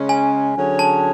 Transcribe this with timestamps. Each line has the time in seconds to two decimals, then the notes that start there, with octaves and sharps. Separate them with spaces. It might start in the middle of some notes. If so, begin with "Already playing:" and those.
Already playing: C#3 G#3 C#4
0.09 G#5
0.56 D3 F#3 C#4 G#4 C#5
0.79 A5